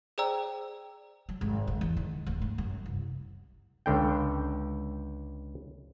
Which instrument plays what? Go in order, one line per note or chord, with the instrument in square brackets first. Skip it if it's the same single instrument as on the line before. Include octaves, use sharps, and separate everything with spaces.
[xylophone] G#4 C5 D5 G5 A#5 E6
[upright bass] F#3
G#1
D3
E2
D#3
D1
G#2
F#2
C2
[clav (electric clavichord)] C#2 D3 G5